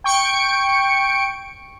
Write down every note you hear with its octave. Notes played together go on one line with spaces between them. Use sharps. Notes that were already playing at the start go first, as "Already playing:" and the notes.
G5 C#6 C#7 D7